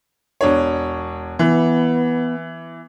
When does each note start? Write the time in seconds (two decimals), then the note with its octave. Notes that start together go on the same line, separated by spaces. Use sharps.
0.41 E1 D4 C#5
1.39 E3 B3